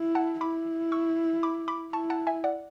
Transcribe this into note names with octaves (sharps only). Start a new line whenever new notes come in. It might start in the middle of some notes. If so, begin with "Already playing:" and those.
Already playing: E4
F#5 A5
E4 B5 D6
C#6 E6
B5 D6
B5 D6
E4 A5 C#6
F#5 A5
E5 G#5
D5 F#5